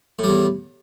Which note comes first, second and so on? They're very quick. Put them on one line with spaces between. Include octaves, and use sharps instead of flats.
A2 G3 E2